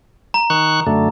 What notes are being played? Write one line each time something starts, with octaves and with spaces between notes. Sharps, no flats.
A#5
D#3 C#6 F#6
F#2 D3 A3